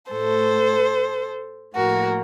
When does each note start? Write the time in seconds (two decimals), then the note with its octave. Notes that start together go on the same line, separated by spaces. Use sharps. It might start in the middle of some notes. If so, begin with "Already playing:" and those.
0.11 A2 A3 A4 C5
1.75 A2 F3 A#3 F#4 A#4